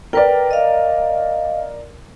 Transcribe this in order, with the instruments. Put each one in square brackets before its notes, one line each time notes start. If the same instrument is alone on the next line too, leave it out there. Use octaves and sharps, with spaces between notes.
[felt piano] A#4 D5 [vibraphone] B4 G5
[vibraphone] D#5 F5